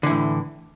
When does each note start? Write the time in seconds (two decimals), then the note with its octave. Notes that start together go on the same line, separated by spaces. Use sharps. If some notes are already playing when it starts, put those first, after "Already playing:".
0.03 D3
0.06 E3
0.09 A2